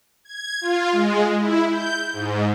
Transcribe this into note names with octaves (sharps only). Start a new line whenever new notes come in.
G#6
F4
G#3
E4
G6
G#2